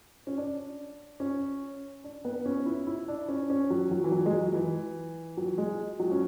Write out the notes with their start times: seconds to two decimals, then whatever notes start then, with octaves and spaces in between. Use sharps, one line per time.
0.27 C#4
0.37 D4
1.20 C#4
2.04 D4
2.25 B3
2.46 C#4
2.66 E4
2.87 E4
3.08 D4
3.28 C#4
3.50 C#4
3.70 F#3
3.87 E3
3.91 F#3
4.04 E3
4.12 F#3
4.26 G#3
4.33 F#3
4.54 E3
5.37 F#3
5.58 G#3
6.00 F#3
6.11 C#4